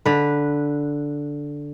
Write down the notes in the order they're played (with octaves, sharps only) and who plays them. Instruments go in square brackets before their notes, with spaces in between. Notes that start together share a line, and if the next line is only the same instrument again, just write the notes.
[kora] D3 B4